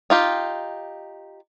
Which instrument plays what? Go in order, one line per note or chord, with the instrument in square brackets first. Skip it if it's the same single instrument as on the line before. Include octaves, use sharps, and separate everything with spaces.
[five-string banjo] D#4 F4 G4